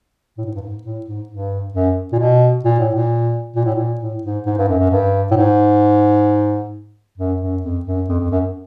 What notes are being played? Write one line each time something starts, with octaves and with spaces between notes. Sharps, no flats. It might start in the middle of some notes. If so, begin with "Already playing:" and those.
A2
G#2
G2
G#2
A2
G#2
G2
F#2
A#2
B2
A#2
A2
A#2
A#2
A2
A#2
A2
G#2
G#2
G2
F#2
F#2
G2
A2
G#2
F#2
F#2
F2
F#2
F2
F2
F#2